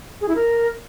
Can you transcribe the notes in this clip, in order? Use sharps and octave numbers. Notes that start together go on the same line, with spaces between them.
G#4
E4
A#4